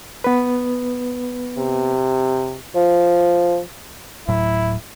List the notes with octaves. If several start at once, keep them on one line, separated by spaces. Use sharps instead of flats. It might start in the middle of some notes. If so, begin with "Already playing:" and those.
B3 B4
C3
F3
D1 A2 F#3 E4